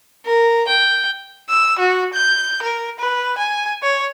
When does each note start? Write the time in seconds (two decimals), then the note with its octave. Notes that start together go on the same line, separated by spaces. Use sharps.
0.25 A#4
0.67 G5
1.49 E6
1.79 F#4
2.14 G6
2.63 A#4
2.99 B4
3.38 G#5
3.83 C#5